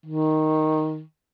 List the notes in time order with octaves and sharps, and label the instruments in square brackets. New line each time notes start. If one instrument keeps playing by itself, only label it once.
[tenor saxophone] D#3